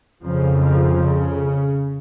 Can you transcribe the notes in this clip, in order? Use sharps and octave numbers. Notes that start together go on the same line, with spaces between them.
F2 C#3 F3
F3
C#3